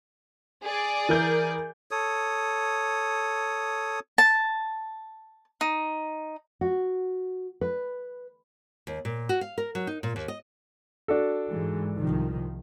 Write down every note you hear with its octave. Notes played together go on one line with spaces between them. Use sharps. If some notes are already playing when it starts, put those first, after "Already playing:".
G#4 D5
E3 A#4 G6
A4 C#5 D#6
A5
D#4
F#4
B4
D#2
A#2
F#4
F5
A#4
F#3
D#4
A#2
D#2
D#5
D4 F#4 A4
G#2 E3 G#3
C2 D#3 F3